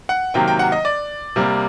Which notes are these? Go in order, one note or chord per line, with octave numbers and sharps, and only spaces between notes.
F#5
C3 D#3 F#3 A#3 G5
G5
F#5
D#5
D5
C3 G3 A#3